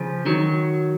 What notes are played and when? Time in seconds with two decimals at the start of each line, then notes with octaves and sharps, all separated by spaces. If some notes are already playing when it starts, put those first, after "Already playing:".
Already playing: C#3 F3
0.26 D#3 F#3